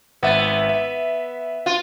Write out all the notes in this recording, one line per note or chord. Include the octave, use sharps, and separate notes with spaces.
G#1 B3 E5 A6
E5
F4